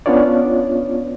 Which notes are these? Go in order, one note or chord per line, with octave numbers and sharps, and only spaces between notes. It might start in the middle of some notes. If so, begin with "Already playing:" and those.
B3 C#4 D4 F4 C#5 D5